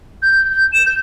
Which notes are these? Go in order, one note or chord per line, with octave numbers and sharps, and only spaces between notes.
G6
G6
E7
G6